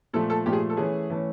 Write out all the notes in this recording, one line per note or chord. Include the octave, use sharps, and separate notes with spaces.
A#2 F3 A3 A4
A4
A#2 F3 A3 G4
G#4
A4
E3 A3 C#4 G#4
E3 A3 C#4